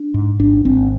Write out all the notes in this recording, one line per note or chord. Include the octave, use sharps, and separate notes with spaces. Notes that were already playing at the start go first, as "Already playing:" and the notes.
Already playing: D4
G#2
G#1 D4
G#1 C4